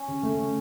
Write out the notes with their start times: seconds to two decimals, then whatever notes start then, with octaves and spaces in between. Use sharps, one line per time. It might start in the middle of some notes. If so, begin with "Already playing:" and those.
Already playing: C#4
0.08 C#3
0.23 A3
0.38 C#3